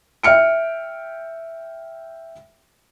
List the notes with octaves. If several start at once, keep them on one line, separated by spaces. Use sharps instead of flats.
E5 G5 F6 C#7 D7